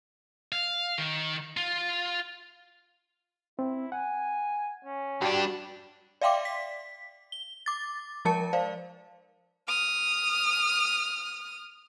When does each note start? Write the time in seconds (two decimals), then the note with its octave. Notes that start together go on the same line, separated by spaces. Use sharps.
0.52 F5
0.98 D#3
1.57 F4
3.59 C4 E4
3.92 F#5 G#5
4.85 C#4
5.22 G2 D4 F#4 G4
6.21 D5 E5 F5 G5 C6 D6
6.45 B6
7.32 G7
7.66 D6 A6
8.25 F3 G#3 A#4 A5 C#7
8.53 C5 D5 F5
9.67 D#6 F6